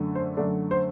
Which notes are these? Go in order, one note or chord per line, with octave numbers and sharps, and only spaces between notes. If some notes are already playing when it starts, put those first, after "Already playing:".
Already playing: F#2 D3 A3
C5
F#2 D3 A3 D4
C5